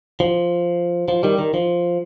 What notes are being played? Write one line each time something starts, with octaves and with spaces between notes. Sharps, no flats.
F3
F3
D#3 G3
D#3
F3